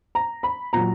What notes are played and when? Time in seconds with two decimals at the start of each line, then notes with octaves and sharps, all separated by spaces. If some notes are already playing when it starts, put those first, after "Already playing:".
0.15 A#5
0.43 B5
0.73 A#2 F#3 A#5